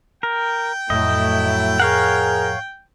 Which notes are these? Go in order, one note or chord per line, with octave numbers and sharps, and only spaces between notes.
A#4 G5
F2 A2 F#3 A3 E4 D#5
G#4 A#4 C#5 F5 F#5